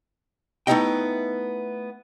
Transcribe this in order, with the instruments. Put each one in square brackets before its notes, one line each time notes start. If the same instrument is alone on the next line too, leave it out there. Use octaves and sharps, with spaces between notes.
[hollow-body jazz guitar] A3 B3 D#4 E4 D#5 G5